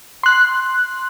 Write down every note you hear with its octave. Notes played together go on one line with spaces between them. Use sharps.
C6 F#6